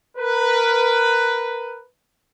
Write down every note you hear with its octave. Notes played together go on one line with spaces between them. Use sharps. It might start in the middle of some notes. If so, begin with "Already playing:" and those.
A#4 B4